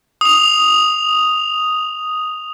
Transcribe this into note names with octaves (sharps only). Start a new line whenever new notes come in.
D#6 F7